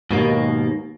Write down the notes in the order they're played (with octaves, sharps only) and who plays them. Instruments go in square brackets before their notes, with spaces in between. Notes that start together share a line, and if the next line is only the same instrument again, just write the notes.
[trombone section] D#2 [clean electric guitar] G#2 B2 A#3